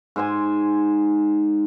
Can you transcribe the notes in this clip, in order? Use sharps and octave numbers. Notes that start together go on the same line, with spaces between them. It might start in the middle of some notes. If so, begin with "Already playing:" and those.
G#2 C5 G#5